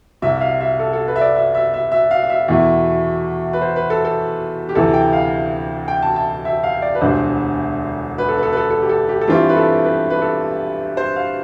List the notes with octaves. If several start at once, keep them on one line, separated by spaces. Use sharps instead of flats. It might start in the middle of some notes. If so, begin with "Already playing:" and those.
C2 C3 G3 E5
E5
F5
E5
A4
A4
B4
E5
D5
E5
E5
E5
E5
F5
F5
E5
E2 B2 A3 E4
B4
C5
B4
A4
A4
G4
D2 C3 E3 A4
G5
F5
G5
A5
A5
E5
F5
D5
B4
E1 D2 D3 G3 D4 C5
B4
A4
B4
A4
B4
A4
A4
G4
A4
G4
A4
G2 E3 A3 C4 F4 G4
B4
A4
B4
B4
A4
C5
F5